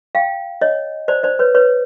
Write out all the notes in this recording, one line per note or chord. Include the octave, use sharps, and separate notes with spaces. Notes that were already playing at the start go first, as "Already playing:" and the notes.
F5 G5
C#5 D#5
C5 D5
C5 D5
B4 C#5
B4 C#5